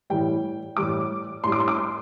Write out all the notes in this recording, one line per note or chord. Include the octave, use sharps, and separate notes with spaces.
A2 E3 G3 G5
A2 E3 G3 D6
A2 G3 C6
D6
C6
D6
C6